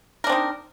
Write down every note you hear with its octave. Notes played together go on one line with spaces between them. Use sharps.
C4 D4 D#4 A#4